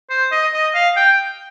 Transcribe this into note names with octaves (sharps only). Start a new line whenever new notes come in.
C5
D#5
D#5
F5
G5